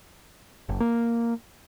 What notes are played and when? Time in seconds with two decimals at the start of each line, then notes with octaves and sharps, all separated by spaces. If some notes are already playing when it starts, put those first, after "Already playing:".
0.69 F#1
0.80 A#3